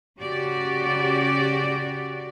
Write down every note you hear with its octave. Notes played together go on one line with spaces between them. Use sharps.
C#3 F#4 G4 D5